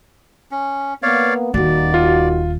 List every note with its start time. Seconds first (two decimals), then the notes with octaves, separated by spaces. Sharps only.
0.51 C#4
1.03 A#3 B3 C#5 D5 F5
1.54 D#1 D#2 A#3 D#4 F#4 D5
1.94 F4